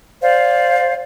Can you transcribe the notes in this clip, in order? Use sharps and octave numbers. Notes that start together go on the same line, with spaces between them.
C5 D5 F5